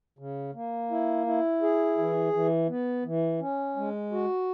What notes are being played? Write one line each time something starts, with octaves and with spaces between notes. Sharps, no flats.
C#3
A#3
E4
E4
G#4
E3
E3
B3
E3
C#4
G#3
F#4